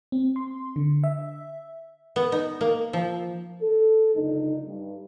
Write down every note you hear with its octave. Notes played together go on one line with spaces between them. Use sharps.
C4
C6
D3
E5
B3
D#4
A#3
F3
A4
F#1 C#2 D3 D4 D#4
G2